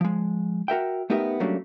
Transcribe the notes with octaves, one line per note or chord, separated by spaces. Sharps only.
F3 G#3
F#4 A#4 E5 G5
A3 B3 D#4 G4 A#4 E5
F#3 G3 A3 A#3 C#4 D4